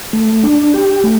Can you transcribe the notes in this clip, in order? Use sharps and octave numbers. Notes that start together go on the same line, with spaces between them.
A3
D4
G4
A3